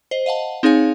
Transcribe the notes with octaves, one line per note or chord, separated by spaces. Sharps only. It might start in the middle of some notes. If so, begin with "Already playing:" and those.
C5 D#5
D#5 F5 F#5 A5
C4 D#4 G#4 C#5 F5 G#5